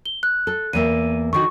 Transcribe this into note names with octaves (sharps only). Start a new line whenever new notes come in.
G7
F#6
A4
E2 A#3 E5 D#7
D3 D#3 F#4 C#6